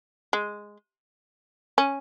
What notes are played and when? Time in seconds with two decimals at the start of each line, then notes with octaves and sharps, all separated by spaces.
0.33 G#3
1.78 C#4